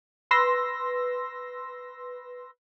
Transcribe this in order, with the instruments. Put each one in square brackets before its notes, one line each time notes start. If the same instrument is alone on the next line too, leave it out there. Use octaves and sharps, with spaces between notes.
[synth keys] B4 C6 E6 A#6